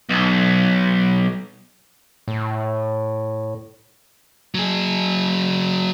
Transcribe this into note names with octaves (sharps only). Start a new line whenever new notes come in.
B1
A2
F#3 G#4